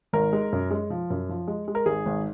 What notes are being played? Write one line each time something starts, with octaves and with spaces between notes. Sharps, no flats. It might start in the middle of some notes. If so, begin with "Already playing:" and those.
G#1 A#4
G#3
F#2
G#3
F3
F#2
F3
G#3
G#3
A#4
G#1 G#4
G#1